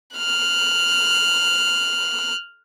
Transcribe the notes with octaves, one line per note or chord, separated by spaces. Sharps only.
F6 F#6